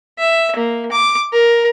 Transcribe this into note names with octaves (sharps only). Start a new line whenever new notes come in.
E5
A#3
D6
A#4